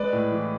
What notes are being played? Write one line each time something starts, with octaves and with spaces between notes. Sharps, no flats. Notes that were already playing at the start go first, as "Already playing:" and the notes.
Already playing: G#3 B4 D5
A2
E3